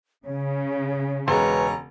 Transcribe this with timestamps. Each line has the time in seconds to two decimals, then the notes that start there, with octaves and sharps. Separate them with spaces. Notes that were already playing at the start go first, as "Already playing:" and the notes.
0.25 C#3 C#5
1.28 E1 G#3 B4 C#5 G#5 A#5